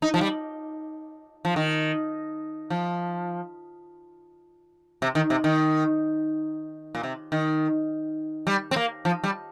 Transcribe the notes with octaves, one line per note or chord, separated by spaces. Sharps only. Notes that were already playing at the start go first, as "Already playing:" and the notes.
D#4
F3
G3
F3
D#3
F3
C3
D#3
C3
D#3
A#2
C3
D#3
G3
C4
A#3
F3
G3